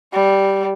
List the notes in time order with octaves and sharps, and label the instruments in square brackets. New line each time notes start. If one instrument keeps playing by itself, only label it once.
[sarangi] G3